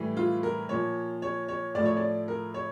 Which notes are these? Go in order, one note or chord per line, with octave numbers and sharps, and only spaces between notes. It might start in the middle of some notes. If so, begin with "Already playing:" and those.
Already playing: A2 E3 G3
F4
A#4
A#2 F3 C#5
C#5
C#5
A2 F3 D5
C#5
D5
A#4
C#5